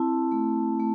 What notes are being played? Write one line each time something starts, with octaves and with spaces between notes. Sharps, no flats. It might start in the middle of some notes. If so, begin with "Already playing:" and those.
Already playing: C4 E4 A5
A3
A3